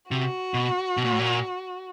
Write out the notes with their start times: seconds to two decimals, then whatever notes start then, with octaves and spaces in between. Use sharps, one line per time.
0.11 C3 F#4
0.54 B2
0.97 B2
1.04 A#2
1.12 A2
1.19 A#2